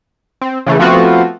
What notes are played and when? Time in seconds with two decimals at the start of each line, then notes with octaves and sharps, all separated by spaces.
0.42 C4
0.66 C#3 E3 A3
0.79 F3 A3 B3 C4 F4 F#4